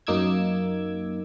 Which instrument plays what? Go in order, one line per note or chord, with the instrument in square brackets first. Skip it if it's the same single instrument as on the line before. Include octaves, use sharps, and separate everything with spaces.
[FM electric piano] F#2 A#3 D#4 D6 E6 G#6